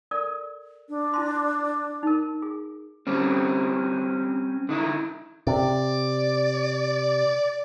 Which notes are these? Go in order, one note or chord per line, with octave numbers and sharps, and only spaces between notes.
A4 A#4 D5
D4
E4 A5 C6
D#4 A#4
G#4
G3 C4 C#4
D3 D#4 E4
C3 D5